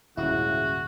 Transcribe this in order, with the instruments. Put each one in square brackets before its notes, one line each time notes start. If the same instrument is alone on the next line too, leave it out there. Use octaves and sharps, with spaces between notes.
[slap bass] D#1 G#2 [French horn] C#3 [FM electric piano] E4 [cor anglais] F#4